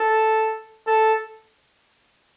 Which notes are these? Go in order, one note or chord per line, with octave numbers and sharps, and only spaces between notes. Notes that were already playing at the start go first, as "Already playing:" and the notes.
Already playing: A4
A4